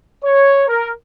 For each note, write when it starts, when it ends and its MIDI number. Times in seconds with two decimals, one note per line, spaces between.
0.25 0.64 73
0.67 0.91 70